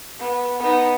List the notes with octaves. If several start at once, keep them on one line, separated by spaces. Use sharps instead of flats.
B3
B3 D#4